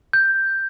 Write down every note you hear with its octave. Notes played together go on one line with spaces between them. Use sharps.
G6